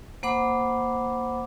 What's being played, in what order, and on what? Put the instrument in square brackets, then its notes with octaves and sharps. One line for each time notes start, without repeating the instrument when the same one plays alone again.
[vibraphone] A#3 C5 F#5 B5 D6